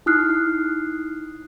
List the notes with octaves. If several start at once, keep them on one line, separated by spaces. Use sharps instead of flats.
D#4 E4 D#6 F6 F#6 C7